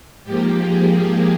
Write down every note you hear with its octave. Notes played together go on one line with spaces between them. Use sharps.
G#2 F3 A#3 G4
G#4